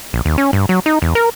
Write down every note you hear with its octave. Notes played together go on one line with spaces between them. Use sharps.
A#1
D#2
C#4
G2
F#3
D#4
E2
A#4